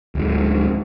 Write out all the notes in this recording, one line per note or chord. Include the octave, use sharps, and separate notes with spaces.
D1 G#2